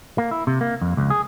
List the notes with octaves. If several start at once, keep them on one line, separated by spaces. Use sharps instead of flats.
A#3
E4
C3
A#3
F2
C#2
G#4